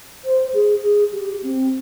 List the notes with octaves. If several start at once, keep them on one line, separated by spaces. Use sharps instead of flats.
C5
G#4
G#4
G4
C4